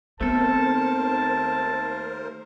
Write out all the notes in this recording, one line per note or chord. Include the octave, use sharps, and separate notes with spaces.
D#2 A3 B3 C4 A4 A#4 C5 A5